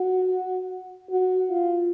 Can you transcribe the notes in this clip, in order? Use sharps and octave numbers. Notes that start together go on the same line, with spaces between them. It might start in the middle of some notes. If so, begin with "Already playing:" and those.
Already playing: F#4
F#4
F4